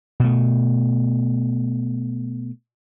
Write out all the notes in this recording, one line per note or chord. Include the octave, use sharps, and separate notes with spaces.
B2 A3